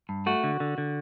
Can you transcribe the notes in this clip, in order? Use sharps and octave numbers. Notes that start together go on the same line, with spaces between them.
G2
A3 F#4
D3
D3
D3